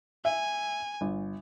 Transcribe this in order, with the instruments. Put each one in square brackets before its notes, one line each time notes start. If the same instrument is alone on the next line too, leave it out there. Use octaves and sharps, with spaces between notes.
[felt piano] E5 [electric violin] G#5
[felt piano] G1